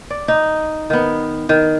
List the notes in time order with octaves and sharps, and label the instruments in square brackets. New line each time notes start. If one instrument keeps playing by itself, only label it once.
[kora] D5
D#4
D#3 B3
D#3